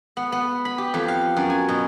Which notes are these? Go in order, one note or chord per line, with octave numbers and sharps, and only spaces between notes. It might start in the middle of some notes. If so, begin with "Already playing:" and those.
B3
B3
B5
G4
F2
F5
F#2
G#5
B2